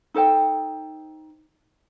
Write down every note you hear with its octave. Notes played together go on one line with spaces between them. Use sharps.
D#4 A4 C5 G5